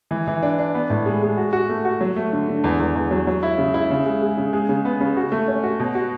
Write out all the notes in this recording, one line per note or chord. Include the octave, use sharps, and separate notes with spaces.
E3
E3
D4
D4
B3
A2
G#3
G#3
F#4
F#4
A3
F#4
F#3
A3
D3
D3
E2
E2
E2
F#3
F#3
E4
C#3
E4
C#3
G#3
G#3
C#3
G#3
C#3
B3
C#3
F#4
A3
C#4
F#4
B2
F#4